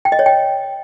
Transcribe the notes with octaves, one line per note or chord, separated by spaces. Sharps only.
G5
D#5
C#5
G5